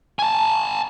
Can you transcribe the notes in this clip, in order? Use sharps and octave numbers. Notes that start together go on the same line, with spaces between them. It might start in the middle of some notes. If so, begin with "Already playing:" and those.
G#5 A5